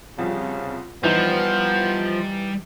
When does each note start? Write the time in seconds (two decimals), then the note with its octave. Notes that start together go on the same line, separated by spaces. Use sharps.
0.18 C2 C#3 F3 G3
1.03 E3 F3 G3 B3 D#4